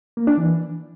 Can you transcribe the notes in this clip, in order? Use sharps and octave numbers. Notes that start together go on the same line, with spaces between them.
A#3
D4
E3